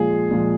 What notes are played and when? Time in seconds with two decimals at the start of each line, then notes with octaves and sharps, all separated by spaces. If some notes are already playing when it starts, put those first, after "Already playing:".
Already playing: A#2 F3 G#3 G#4
0.31 A#2 F3 G#3